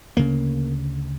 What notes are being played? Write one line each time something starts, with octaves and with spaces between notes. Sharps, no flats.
D2 C#3 A#3